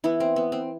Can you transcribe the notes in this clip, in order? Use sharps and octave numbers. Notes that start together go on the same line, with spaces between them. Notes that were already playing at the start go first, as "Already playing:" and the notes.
E3 B3 E4
C4
B3
C4